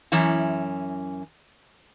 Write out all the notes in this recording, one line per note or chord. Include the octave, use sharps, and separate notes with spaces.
F#2 E3 C#4 E4